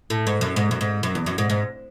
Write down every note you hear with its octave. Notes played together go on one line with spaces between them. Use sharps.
A2
G#2
F#2
G#2
F#2
G#2
F#2
E2
F#2
G#2
G#2